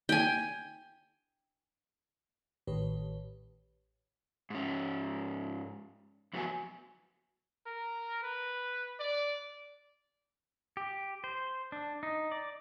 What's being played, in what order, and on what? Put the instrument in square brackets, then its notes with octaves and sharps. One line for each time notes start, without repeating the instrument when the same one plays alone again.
[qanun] G5 G#5
[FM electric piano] A1 A2 D#3 G4 B4 C#5
[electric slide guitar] G#2 C#4
F2 E3 F#3 B3 F#4 G#5
[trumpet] A#4
B4
D5
[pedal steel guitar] G4
C5
D4
D#4
D5